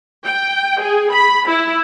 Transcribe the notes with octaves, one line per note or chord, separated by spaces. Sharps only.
G5
G#4
B5
E4